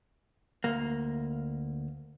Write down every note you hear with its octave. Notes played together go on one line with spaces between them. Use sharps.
D2 A#3